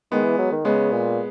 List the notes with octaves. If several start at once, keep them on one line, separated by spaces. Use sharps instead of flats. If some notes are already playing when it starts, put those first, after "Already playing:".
D#3 G#3 B3
E3
F#3
D#3
C#3 G#3 B3
A#2